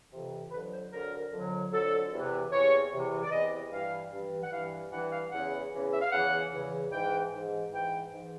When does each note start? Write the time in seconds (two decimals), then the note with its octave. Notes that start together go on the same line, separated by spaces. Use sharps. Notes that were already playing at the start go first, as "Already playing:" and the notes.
0.12 F2 C3 E3
0.51 F2 D3 F#3 B4
0.72 C5
0.91 F2 D3 F#3 A#4
1.32 F2 D3 F#3
1.71 F2 D3 F#3 A4
2.12 E2 C3 E3
2.52 E2 C3 E3 C#5
2.91 E2 C3 E3
3.23 D5
3.31 E2 C3 E3 D#5
3.71 G2 E3 F5
4.11 G2 E3
4.42 F#5
4.52 G2 E3 F5
4.92 G2 E3 F#5
5.12 F5
5.31 E2 C#3 E3 F#5
5.72 E2 C#3 E3
5.92 E5
6.02 F5
6.11 E2 C#3 E3 F#5
6.51 E2 C#3 E3
6.91 G#2 E3 G5
7.32 G#2 E3
7.71 G#2 E3 G5
8.12 G#2 E3